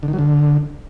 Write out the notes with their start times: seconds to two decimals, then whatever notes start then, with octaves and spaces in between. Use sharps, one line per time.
0.03 D3
0.08 D#3
0.13 F#3
0.19 D3